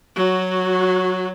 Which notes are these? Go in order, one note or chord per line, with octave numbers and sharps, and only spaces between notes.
F#3 F#4